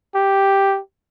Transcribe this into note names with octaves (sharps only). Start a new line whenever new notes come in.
G4